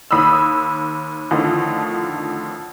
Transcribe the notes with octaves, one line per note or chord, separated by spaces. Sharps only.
D#2 B5 D#6 E6
F2 A2 D3 D#3 F3